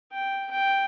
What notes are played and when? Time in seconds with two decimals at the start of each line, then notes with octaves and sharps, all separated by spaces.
0.12 G5
0.51 G5